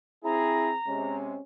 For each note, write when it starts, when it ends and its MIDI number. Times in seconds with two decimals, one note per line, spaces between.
0.24 0.74 60
0.24 0.70 64
0.24 0.74 68
0.24 1.16 82
0.87 1.36 48
0.87 1.36 56
0.87 1.42 61